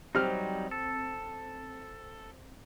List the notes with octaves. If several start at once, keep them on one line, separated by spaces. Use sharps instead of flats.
F#3 G3 C4 D#4 G4 F6
A4